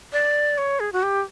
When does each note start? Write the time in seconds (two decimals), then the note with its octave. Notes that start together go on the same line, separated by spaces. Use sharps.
0.13 D5
0.58 C#5
0.80 G#4
0.93 F#4
1.03 G4